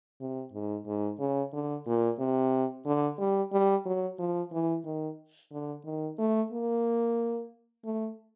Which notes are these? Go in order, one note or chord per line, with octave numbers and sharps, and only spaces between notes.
C3
G#2
G#2
C#3
D3
A#2
C3
D3
G3
G3
F#3
F3
E3
D#3
D3
D#3
A3
A#3
A3